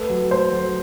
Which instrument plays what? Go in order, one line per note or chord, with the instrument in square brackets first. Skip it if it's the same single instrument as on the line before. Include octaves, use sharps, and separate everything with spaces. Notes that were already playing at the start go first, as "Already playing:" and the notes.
Already playing: [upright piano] A3 [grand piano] B4
[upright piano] F#3
[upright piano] A3 [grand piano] C5
[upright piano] F#3